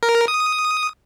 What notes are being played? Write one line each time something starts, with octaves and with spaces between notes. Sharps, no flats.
A#4
D#6